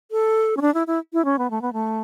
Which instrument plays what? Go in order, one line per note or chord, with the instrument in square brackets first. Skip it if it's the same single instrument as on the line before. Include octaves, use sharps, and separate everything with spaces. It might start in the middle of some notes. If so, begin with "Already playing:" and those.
[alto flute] A4
C#4
D4
E4
E4
E4
C#4
B3
A3
B3
A3